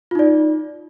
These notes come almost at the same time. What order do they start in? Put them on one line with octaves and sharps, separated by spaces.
F4 D#4 D5